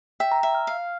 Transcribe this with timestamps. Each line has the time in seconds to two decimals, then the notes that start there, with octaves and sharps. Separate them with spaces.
0.20 E5 G5
0.32 A#5
0.43 E5
0.55 F6
0.67 F5